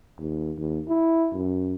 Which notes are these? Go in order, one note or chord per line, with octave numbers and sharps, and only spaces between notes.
D#2
D#2
E4
F#2